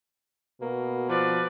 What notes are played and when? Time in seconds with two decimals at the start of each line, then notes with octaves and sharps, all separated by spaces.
0.61 B2 A#3
1.09 F3 B4 D5